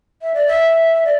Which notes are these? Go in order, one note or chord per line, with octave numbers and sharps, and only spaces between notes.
E5
D5
E5
D5